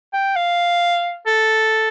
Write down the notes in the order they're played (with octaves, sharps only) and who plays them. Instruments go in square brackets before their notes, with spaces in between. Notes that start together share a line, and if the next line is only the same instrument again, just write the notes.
[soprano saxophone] G5
F5
A4